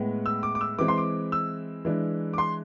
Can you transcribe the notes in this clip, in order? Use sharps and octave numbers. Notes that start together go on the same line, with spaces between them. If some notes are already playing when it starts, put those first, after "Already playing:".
Already playing: A2 G#3 B3
E6
D6
D6
E6
E3 G#3 C4 D6
C6
D6
E6
E3 G#3 D4
D6
C6